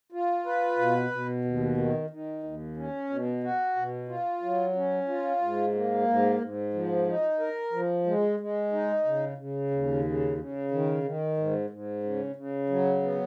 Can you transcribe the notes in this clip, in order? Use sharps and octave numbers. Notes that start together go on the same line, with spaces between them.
F4
B4
B2
B2
D#2
D#3
D#3
D#2
C#4
B2
F#4
B2
F4
F#3
C#4
F4
G#2
A#3
G#2
G#2
F3
D#4
A#4
F3
G#3
G#3
D#4
C#3
C#3
D#2
C#3
C#3
D#3
D#3
G#2
G#2
C#3
C#3
F#3
B3